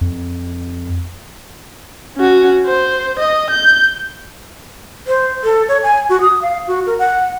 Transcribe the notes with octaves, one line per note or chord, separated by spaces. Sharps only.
F2
C#4 F#4
C5
D#5
G6
C5
A4
C#5
G#5
F#4
D#6
F5
F#4
A#4
F#5